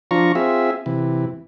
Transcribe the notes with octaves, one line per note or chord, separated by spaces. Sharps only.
F3 D4 F4 A#5 C#6
C4 F4 G#4 E5
C3 E3